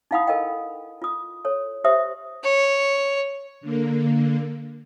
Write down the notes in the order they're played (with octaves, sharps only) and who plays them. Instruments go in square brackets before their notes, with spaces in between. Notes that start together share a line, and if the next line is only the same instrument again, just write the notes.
[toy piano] D#4 E4 F5 F#5 B5 D#6
A4 A#4 D#5 F5 G5
F4 D#6
A4 C#5
G4 C5 E5 D#6
[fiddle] C#5
[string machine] D3 A#3